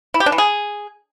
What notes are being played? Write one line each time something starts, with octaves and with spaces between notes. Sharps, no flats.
E4
G4
D4
E3
G#4